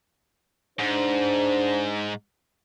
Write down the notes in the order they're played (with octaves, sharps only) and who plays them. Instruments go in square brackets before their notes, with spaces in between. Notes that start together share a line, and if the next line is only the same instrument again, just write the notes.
[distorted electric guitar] G#2 [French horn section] D4 C5